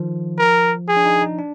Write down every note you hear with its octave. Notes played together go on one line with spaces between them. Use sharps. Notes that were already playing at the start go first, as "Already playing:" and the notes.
Already playing: D#3 F3
A#4
G#4
D4
D#4
D#4
D4